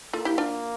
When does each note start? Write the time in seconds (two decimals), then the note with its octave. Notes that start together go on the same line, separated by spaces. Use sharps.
0.13 A#3 F4 A4
0.25 E4 G4
0.38 D4 F4